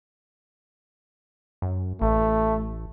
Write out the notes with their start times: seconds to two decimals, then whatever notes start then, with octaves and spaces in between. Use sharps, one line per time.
1.62 F#2
2.01 A1 A3